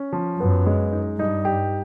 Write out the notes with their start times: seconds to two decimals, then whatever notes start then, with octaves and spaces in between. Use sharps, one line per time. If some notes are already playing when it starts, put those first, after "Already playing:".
Already playing: C#4
0.13 F3
0.40 F#2 B3
0.67 G#3
0.92 D#4
1.19 G2 D#4
1.45 G4